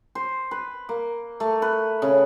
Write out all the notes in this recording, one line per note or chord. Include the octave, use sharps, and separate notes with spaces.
C5
B4
A#3
A3
B4
C#3